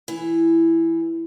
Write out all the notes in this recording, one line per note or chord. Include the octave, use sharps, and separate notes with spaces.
E3